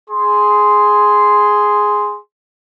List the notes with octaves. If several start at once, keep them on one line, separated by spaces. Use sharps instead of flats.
G#4 C6